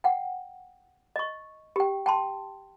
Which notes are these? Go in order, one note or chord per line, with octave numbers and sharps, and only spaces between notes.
F#5 G5
D#5 C#6
G4 G5
G5 A5 C6